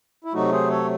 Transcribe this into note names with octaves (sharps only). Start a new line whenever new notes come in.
E4
C3 F#3 A3 D#4 F#4
G#4 C5
A4 C#5